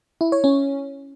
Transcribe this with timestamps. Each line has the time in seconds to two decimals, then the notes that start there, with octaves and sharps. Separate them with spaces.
0.21 E4
0.32 C#5
0.44 C#4